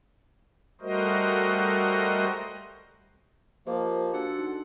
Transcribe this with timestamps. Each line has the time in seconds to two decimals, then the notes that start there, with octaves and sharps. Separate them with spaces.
0.81 G3 A3 F#4 A#4 C5 D#5
3.67 F3 A#3 G4 C5 D#5
4.14 D4 F#4 A4 F#5
4.39 D#4